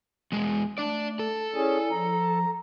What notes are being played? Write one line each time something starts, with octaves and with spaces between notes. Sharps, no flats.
E2 G#3
A3 D4 D5
A4
C#4 E4 G#4 D5 G#5
F3 A#5